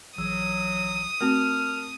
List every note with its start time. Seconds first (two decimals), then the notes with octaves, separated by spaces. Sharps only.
0.18 A#1 E3 F#3 D#6 E6
1.21 A3 C4 F#4 A#4 A5 F6